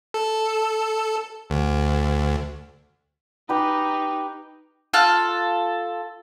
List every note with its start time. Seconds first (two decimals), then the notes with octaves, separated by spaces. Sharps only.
0.14 A4
1.50 D2
3.49 D#4 G4 B4
4.94 F4 A4 F6 F#6